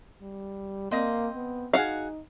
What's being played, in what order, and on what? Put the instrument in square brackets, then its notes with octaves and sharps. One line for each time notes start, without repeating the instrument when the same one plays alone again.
[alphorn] G3
[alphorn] A#3 [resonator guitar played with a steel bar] C4 D#5
[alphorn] B3
[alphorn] D#4 [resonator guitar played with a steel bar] F#4 G#4 [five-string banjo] F5 F#5